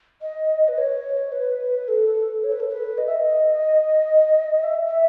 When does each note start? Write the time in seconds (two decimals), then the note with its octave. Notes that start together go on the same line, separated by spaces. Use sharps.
0.22 D#5
0.68 B4
0.78 C#5
1.32 B4
1.88 A4
2.44 C#5
2.52 B4
2.60 A4
2.69 B4
2.98 D#5
3.06 E5
3.14 D#5
4.63 E5
4.88 E5